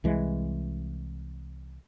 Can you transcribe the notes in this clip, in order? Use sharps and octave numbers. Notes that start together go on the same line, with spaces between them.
C2 E3 G#3